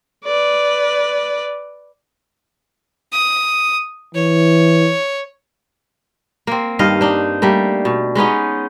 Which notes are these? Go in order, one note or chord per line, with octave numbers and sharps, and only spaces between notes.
B4 D5
D#6
E3 C#5
A#3 C4
G2 D#3 D#5 F5
D4 D#4
G3 A3 A#3
B2
G#3 B3 C#4 D#4